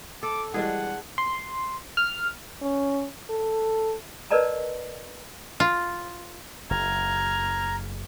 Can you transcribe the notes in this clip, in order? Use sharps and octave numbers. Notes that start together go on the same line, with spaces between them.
A4 D6
E3 G3 G#3 D4 G#4 F#5
C6
F6
C#4
A4
A#4 B4 D5 D#5 A5 A#5
F4
F#1 A#5 F6 G#6